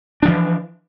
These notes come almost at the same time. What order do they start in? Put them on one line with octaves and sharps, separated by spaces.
D4 F3 E3